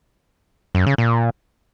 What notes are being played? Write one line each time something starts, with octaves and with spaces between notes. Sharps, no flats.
F#2
C#3
A#2